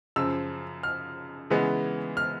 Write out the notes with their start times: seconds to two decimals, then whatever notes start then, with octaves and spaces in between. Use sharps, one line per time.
0.16 F#2 C#3 F3 E6
0.83 F6
1.50 C#3 E3 G#3 B3
2.17 F6